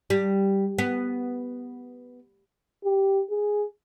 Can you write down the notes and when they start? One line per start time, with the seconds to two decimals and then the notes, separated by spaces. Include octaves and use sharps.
0.10 G3
0.78 B3
2.84 G4
3.30 G#4